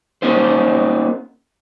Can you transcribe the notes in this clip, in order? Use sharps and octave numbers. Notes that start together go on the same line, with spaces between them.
A#3 C#4 D#4 C5